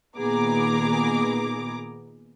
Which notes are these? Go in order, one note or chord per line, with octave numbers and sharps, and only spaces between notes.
A#2 D#3 B3 G#4 A#5 D6